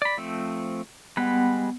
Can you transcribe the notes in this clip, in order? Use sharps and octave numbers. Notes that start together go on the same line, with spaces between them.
D5 B5
F3 A3 C4
G3 G#3 B3 B4 F#5